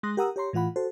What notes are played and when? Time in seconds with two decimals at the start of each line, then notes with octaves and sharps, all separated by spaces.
0.03 G#3 C6 D#6 F#6 A#6
0.17 G4 A#4 F#5 A#5 D#6 E6
0.36 G4 C#5 A#5 C6
0.53 A2 E3 F4 F#5 B5
0.76 F#4 A4 C5